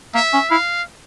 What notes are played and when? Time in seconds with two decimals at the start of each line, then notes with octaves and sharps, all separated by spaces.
0.14 A#3 E5
0.33 C#4
0.50 E4 F5